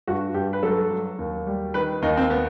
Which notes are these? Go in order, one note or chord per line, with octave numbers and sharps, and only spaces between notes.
G2 F#4
G2 G4
B4
F#3 A4
F#3
D#2
G3
D#3 B4
D#2 D#4
C4
B3